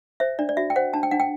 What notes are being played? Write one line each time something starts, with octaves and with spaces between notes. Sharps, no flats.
C5 E5
D4 D5
D5
F#4 E5
G5
C5 F#5
D4 A5
G5
D4 F#5
G5